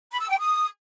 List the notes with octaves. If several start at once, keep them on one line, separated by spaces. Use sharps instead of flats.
B5
E6
G5
D#6